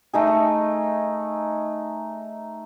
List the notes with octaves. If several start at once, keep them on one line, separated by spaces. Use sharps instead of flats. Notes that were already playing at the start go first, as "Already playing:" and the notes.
A3 D#4 G#4